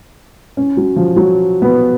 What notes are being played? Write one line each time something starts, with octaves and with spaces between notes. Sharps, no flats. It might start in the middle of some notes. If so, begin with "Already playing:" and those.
C#4
F#3
F3
F#3
B3